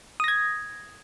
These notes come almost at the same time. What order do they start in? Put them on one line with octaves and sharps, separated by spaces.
D#6 A#6 G#6